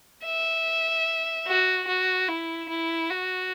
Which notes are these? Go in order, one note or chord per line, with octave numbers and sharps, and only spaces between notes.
E5
F#4
F#4
E4
E4
F#4